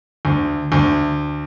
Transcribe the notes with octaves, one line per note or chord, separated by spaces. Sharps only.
D2
D2